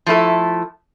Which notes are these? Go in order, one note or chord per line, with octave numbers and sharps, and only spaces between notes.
F3 A3 E4 A4